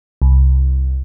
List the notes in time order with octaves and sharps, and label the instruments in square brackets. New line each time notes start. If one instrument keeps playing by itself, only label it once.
[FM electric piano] C2